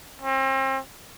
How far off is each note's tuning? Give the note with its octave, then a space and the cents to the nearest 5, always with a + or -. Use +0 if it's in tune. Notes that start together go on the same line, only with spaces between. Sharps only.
C4 +35